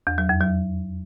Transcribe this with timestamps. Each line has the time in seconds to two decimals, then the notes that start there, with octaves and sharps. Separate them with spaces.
0.07 E2
0.18 F#3
0.29 F2
0.41 F#3